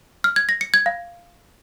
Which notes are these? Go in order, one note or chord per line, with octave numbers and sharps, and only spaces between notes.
F6
G#6
A#6
C#7
G#6
F5